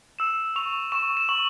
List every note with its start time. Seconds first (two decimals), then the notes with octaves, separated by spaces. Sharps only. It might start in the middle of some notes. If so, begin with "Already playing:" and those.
0.19 E6 E7
0.56 C#6 F7
0.92 C#6 E7
1.17 E7
1.29 C#6 F#7